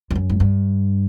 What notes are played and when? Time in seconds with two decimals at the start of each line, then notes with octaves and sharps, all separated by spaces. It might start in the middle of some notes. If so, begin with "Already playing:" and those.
0.11 F2
0.15 F#2
0.30 G#2
0.40 G2